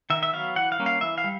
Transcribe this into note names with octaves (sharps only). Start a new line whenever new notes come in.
D#3 E5
E5
F#3 B3 F5
E3 F#5
F5
G3 A#3 C#4
F5
E3 E5
F5
G3